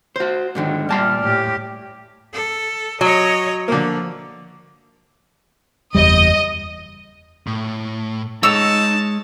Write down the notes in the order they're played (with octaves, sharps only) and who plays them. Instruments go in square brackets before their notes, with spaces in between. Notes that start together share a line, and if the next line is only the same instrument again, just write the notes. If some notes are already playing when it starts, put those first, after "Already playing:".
[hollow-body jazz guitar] F#4 C5
G#2 D3 D#3
[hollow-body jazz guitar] A#2 A5 C6 [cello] G3 [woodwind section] D5 D6 F6
[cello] A2 G4
A4
[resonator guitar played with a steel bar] F#3 [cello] C#5 D#5
[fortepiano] D3 A#3 [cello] F3
[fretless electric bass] F#1 E2 G3 [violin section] D#5
[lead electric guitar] A2
[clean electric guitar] G#3 C#5 [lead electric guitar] D#4 [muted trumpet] A5 [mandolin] E6